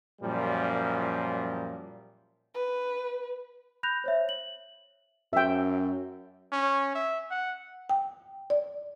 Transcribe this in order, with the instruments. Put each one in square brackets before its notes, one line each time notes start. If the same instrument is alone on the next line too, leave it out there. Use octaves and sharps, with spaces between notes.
[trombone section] F#2 A#2 F3 G3
[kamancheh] B4
[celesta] B5 F#6 G6 A#6 F7
C5 C#5 E5
F#7
[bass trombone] F#2 [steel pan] E5 G5
[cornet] C#4
E5
F#5
[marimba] G5
D5